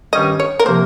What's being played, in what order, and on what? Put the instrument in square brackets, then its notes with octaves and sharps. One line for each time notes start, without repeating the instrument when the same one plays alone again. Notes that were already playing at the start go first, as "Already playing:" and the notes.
[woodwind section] G2 D#3 G3 C#4 [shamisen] D#5
[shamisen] C#5
A#4
[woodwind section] C3 F3 A#3 [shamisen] C5